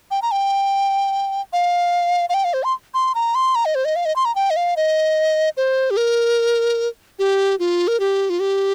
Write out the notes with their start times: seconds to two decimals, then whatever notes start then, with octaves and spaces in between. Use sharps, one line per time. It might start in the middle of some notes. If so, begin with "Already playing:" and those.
0.11 G5
0.22 A#5
0.32 G5
1.53 F5
2.29 F5
2.34 G5
2.44 F5
2.54 C5
2.64 C6
2.94 C6
3.15 A#5
3.35 C6
3.55 A#5
3.65 D#5
3.75 C5
3.85 D#5
3.96 F5
4.05 D#5
4.16 C6
4.25 A#5
4.35 G5
4.50 D#5
4.56 F5
4.77 D#5
5.57 C5
5.91 G4
5.97 A#4
7.19 G4
7.60 F4
7.88 A#4
8.00 G4
8.30 F4
8.40 G4